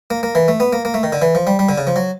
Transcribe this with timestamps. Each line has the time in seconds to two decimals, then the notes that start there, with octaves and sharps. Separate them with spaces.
0.10 A#3
0.23 A#3
0.35 E3
0.48 A3
0.60 B3
0.73 A#3
0.85 A#3
0.94 A3
1.03 D#3
1.13 D3
1.22 E3
1.35 F3
1.47 G3
1.59 G3
1.69 D3
1.78 C#3
1.87 F3
1.96 F#3